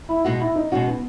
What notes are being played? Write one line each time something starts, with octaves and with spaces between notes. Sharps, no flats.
E4
B2 G#3 D#4 F#4
E4
D#4
B2 G#3 C#4 D#4 F#4
B3